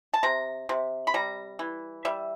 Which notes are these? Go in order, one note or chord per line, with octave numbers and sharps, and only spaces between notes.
A5
C3 A#5
C3
B5
G3 A#5
E3
G3 E5